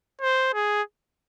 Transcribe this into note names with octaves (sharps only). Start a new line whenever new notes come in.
C5
G#4